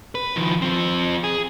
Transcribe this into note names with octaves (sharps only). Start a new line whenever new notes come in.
B4
D#3 F3
F3 C4
G#4